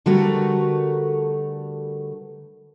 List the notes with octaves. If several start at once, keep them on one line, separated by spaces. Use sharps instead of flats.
D3 G3 A3 F#4 A#4 B4